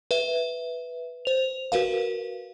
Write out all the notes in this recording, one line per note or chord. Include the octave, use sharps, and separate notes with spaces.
B4 E5
C5 F7
F#4 A#4 B4 F5